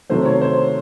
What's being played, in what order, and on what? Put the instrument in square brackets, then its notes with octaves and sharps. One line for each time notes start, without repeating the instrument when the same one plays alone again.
[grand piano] C3 D#3 F#3 A3 C5
C#5
C5